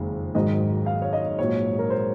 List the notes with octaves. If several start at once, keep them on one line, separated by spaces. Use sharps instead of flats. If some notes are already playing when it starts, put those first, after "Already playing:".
Already playing: F#1 F2 D#3 G#3
G#1 G#2 D#3 F#3 D#5
F5
C#5
D#5
A#1 G#2 F#3 C#5
A#4
C5